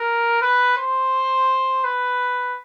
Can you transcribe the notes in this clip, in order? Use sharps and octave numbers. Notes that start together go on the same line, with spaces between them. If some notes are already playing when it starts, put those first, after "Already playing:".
Already playing: A#4
B4
C5
B4